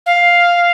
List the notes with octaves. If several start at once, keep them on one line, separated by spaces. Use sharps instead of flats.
F5